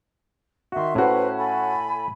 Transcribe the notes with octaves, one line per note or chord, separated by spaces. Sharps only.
D#3 F#4 E5 C6
A2 C#4 F#4 B4 C5 A#5
A4 G#5 B5